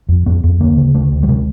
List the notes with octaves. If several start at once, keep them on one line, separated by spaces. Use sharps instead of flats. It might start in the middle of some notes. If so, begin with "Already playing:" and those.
F2
F2 B3
F2
D2 A#3
C#3
D2 A3
D2
G3
C3 G#3